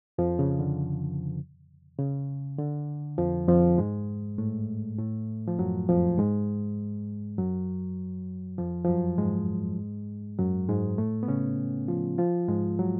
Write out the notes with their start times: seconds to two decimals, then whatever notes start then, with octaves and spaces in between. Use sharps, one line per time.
0.18 F2 F3
0.39 C#3
0.59 D3
1.99 C#3
2.59 D3
3.18 F2 F3
3.48 F2 F3
3.78 G#2 G#3
4.38 A2 A3
4.98 A2 A3
5.48 F3
5.59 F#2 F#3
5.89 F2 F3
6.18 G#2 G#3
7.39 F#2 F#3
8.58 F2 F3
8.84 F3
8.88 F#2 F#3
9.18 G#2 G#3
10.39 F#2 F#3
10.69 G#2 G#3
10.98 A2 A3
11.23 B3
11.28 C#3 C#4
11.88 F3 F4
12.18 F3 F4
12.48 G#2 G#3
12.79 F#3